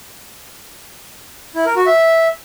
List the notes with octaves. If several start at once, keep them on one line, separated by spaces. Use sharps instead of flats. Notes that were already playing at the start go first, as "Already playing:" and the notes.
E4
A#4
F#4
E5